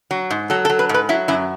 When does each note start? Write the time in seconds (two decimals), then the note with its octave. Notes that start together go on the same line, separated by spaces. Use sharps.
0.11 F#3
0.30 G#2
0.50 F#3 A4
0.65 A4
0.70 F#3
0.79 B4
0.89 G#2 B4
1.09 F#3 E4
1.28 F#2 E4